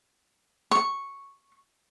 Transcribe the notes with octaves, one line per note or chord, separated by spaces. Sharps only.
C#6